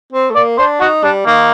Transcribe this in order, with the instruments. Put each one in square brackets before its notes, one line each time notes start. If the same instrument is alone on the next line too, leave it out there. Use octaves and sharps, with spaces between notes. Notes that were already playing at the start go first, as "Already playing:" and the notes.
[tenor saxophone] C4
A3
[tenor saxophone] A#3 [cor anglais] D5
[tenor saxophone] D4 [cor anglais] C5
[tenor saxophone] D#4 [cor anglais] F#4
[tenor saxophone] G3 [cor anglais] D4
[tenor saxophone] D#3 [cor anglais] A#3